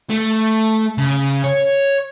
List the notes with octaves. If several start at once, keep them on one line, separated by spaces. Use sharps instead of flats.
A3
C#3
C#5